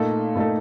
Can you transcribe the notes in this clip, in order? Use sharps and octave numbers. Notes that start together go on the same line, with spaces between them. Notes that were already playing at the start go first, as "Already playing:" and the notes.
Already playing: A#2 A3 D#4 A4
A#2 A3 D#4 A4